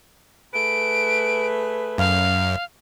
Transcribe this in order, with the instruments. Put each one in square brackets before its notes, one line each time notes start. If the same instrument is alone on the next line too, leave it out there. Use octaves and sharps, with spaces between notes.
[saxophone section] A3 G#4 B4 [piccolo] D7
[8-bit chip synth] F#2 [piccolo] F5